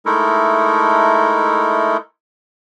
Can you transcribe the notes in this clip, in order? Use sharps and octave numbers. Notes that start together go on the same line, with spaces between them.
G#3 A3 D#4 E4 A4 A#4